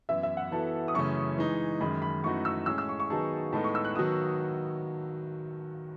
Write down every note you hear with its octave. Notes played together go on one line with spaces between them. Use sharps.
F#2 E3 B3 E4 E5
E5
F#5
E3 B3 F#4 A4 A5
D#6
F#2 C#3 E3 A3 C#4 C#6
E3 G#3 D#4
F#2 D#3 G#3 B5
B5
F#2 E3 A3 D#4 F#4 C#6
E6
A2 G#3 C#4 G#4 E6
E6
C#6
C#6
D#3 F#3 B3 D#4 G#4 A5
A2 G#3 B3 D#4 A4 A5
C#6
E6
F#6
D#3 F#3 B3 F#4 D#6